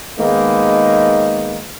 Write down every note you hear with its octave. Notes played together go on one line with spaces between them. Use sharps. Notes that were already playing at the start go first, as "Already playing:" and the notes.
D#3 G#3 A#3 B3 D#4